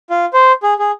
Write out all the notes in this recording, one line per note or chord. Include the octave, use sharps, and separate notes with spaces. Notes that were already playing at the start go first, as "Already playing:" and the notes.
F4
C5
G#4
G#4